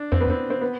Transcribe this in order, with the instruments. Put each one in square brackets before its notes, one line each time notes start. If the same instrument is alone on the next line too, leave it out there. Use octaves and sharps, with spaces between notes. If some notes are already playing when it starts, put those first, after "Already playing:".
Already playing: [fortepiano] D4
[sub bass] F2 [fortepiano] C4
[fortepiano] B3
C4
C4
B3